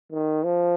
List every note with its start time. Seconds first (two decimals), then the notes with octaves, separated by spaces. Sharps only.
0.12 D#3
0.45 F3